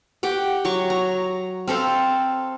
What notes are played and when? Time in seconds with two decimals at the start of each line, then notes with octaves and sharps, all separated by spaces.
0.23 G4 F#5 G5
0.65 F#3 C#5 C#6
0.90 A#5
1.68 C4 A4 C5 F5